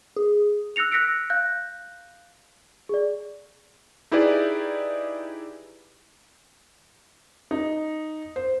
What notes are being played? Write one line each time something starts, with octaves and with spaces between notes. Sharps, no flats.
G#4
E6 F#6 A#6 C#7 F7
E6 F#6 A#6 B6 C#7 D7
F5 F#6 G6 A#6
G#4 D5
D#4 E4 G4 G#4 B4 D5
D#4
C5